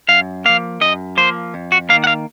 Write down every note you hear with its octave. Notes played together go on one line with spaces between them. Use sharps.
F#2 F5
F3 A#3 F5
F#2 D#5
F3 A#3 C5
F2
F#4
D#3 A#3 F5
F#5
F5